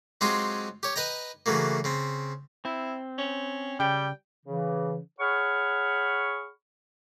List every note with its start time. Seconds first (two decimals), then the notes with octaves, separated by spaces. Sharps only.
0.21 F#3 G#3 C4 F4 G4 G#4
0.83 G4 C#5
0.96 B4 D#5 G5 A#5
1.46 C#3 E3 F#3 A3 A#3
1.84 C#3 C4
2.65 C4 E4
3.18 C#4
3.80 C#3 G3 G5
4.46 C#3 E3
5.20 G#4 C#5 F#5 B5 C#6 F6